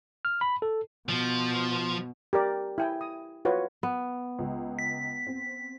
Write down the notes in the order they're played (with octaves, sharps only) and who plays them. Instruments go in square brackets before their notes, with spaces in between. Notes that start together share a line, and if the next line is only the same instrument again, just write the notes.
[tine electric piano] F6
B5
A4
[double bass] B2 [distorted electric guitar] F3
[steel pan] G4 A#4 D5
E4 G5 G#5
D#6
F4 F#4 B4 C#5
[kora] B3
[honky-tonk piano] C#2
[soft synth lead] B6
[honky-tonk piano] C4